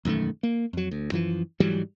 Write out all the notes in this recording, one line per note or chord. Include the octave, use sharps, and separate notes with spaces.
E1 F#2 D#3 A3
A#3
F2 F#3
D2
F#2 E3 F3
G#2 E3 F#3 G3